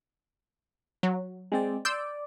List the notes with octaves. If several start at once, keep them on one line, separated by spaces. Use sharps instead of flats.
F#3
G#3 C4 D5
D5 C6 E6 G6